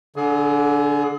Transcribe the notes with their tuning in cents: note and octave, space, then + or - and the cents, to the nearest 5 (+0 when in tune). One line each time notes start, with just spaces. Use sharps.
D3 -10 G#4 +30